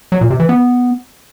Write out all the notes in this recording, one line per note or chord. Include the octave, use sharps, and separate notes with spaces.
F#3
A#2
C3
E3
B3